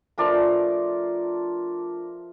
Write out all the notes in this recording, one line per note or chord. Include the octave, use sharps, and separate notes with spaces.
F3 A3 D4 F4 A#4 D5